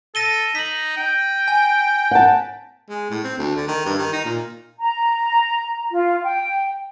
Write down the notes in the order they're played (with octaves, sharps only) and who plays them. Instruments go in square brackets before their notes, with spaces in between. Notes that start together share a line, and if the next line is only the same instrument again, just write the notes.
[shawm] A4 [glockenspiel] A#6 D#7 G7
[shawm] D#4 [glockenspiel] B6 F#7
[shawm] G5
[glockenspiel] G#5
[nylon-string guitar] F#5 A5
[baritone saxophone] G#3
A2
C4
D2
D3
D#3
G2
D#3
D#4
A#2
[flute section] A#5
F4
G5